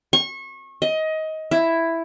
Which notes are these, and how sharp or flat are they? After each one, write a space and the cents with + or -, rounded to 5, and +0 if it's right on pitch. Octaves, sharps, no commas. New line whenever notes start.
C#6 -30
D#5 +20
E4 +5